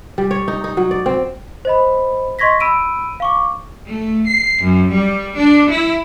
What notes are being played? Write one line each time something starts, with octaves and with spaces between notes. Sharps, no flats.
G3
C#5
D#4
D#4
F#3
D5
C4
C5 D#5 B5
D#5 C6 C#6 G#6 A#6 B6
B5 E6 D7 D#7
F5 C#6 D6
A3
C7
F#2
G3
D4
E4